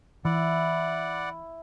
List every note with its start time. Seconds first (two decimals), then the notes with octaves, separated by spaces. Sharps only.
0.25 E3 E4 D5 F#5